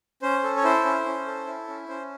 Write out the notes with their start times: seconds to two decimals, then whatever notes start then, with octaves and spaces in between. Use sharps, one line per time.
0.22 C#4 C5
0.43 A4
0.56 C#5
0.64 E4 C5
0.85 C#4
1.06 C#4
1.26 A4
1.47 E4
1.68 C#4
1.88 C#4 C5